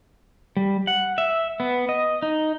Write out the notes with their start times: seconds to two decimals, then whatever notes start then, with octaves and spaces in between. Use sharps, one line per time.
0.57 G3
0.87 F#5
1.18 E5
1.60 B3
1.89 D#5
2.22 D#4